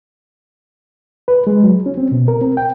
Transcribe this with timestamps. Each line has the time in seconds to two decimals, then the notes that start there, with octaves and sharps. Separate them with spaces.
1.28 B4
1.47 G#3
1.63 F#3
1.86 C#4
1.97 C4
2.12 B2
2.28 A#4
2.41 C4
2.57 G5